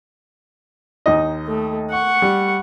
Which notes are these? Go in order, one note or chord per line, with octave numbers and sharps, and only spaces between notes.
D#2 D#4 D#5
A3
F#5 C#6
G3